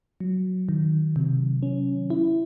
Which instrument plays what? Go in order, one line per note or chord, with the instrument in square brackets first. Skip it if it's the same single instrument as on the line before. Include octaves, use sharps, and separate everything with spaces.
[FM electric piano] F#3
D#3
C3
C#4
E4